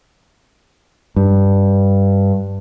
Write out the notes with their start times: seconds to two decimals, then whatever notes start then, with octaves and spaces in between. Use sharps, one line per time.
1.16 G2